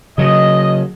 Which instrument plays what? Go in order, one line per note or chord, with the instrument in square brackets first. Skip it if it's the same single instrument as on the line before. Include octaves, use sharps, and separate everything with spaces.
[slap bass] C#3 F#3 [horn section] D#5